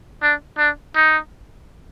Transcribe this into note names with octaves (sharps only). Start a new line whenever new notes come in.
D4
D4
D#4